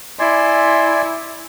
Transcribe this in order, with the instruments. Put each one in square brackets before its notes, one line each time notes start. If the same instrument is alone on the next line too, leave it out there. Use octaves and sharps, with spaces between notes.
[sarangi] E4 [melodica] D5 G#5 C6